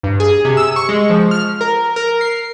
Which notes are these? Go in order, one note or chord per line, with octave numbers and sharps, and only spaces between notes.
G2
G#4
C3
E6
C#6
G#3
F3
F6
A#4
A#4
C7